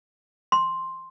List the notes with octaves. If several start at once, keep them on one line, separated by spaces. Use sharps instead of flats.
C6